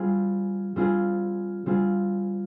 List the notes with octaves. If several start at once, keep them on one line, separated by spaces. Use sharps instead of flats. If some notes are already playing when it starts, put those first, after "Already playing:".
Already playing: G3 C4 F4 G#4
G3 C4 F4 G#4
G3 C4 F4 G#4